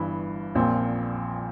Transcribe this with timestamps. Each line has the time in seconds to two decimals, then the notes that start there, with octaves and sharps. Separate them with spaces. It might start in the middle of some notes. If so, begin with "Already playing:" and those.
Already playing: G1 G2 E3
0.55 A#1 A#2 F3 C4